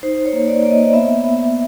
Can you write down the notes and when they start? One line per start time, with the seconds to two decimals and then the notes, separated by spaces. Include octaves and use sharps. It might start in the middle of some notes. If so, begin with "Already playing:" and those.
0.03 D#4 C5
0.26 C#5
0.33 A#3
0.48 D5
0.63 A#3 D5
0.71 D#5
0.93 B3 E5
1.24 B3